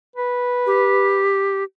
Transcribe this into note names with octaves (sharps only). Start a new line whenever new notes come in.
B4
G4